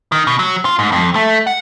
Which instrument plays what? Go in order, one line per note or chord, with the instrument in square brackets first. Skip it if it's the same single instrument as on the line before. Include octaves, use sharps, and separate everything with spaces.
[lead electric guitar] D#3
B2
F#3
F4
G#2
F2
A3
F#5